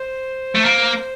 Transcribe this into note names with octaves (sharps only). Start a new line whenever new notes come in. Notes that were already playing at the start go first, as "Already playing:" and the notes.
Already playing: C5
A3
A#3